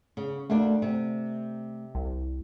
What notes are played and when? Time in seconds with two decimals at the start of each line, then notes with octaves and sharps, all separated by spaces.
0.17 C#3
0.50 D2 A3 A#3 D4
0.82 C3
1.95 C2